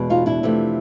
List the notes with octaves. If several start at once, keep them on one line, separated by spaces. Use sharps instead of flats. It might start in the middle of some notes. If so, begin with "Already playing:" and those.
Already playing: E2 B2 G#3
D#4 F4
D4 E4
F2 C3 E3 A3